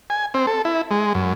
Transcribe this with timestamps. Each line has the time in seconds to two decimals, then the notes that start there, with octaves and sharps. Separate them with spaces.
0.10 G#5
0.34 C4
0.47 A4
0.65 E4
0.91 G#3
1.15 F#2